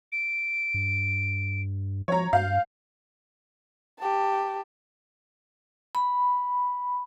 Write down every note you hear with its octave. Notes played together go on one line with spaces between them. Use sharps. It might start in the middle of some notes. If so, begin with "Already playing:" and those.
D7
G2
F3 C#5 A#5
G2 F5 G6
G4 A5
B5